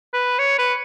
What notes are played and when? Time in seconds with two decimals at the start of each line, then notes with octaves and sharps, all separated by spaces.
0.13 B4
0.39 C#5
0.58 B4